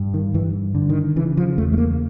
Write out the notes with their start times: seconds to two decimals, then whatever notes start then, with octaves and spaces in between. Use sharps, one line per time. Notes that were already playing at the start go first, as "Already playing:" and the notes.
Already playing: G2
0.14 D#3
0.34 G2 E3
0.75 D3
0.89 D#3
1.16 C#3 E3
1.37 F3
1.58 E2 A3
1.73 A3
1.78 A#3